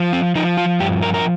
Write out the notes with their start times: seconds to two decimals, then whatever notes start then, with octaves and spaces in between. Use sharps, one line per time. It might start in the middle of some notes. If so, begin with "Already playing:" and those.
Already playing: F3
0.13 C4
0.35 F3 D#4
0.57 F4
0.79 G2 G4
1.02 A#4
1.14 A#4